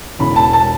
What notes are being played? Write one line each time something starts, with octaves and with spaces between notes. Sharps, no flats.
E1 E2 C#3 B5
A5
A5